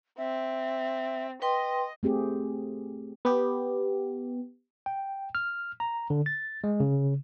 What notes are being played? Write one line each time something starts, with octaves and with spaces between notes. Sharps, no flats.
C4 E5
B4 D#5 G5 C6
A3 C4 G4 G#4
B3 G4
G5
F6
A#5
D3
A6
G#3
C#3